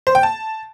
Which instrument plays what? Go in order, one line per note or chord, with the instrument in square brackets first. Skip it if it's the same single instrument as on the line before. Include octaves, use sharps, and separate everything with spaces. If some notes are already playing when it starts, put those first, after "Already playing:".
[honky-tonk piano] C5
G5
A5